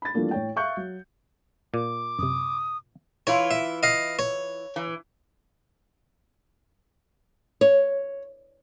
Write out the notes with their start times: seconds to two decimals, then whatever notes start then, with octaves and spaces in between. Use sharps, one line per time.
0.02 B5 A6
0.14 E3 F3 G3 A3 A#3 D4
0.31 A2 C#5 G5
0.56 E5 F5 C#6 F#6 G6 C#7
0.77 F#3
1.74 A#2 D6
2.19 F#2 C3 D#6
3.27 E3 E4 F4 C#5
3.51 E5
3.83 D#5 F5
4.19 C#5
4.76 E3
7.61 C#5